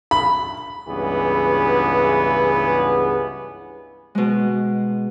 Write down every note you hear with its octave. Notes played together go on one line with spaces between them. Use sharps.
B5
C#2 G2 E3 B3 G#4
B2 G#3